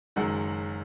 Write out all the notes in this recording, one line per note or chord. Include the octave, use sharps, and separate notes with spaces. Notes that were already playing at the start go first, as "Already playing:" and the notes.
F#1 F#2 D#3 G#3 F#5